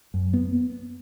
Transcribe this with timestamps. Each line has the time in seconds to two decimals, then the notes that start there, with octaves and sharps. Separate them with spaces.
0.14 F#2
0.34 B3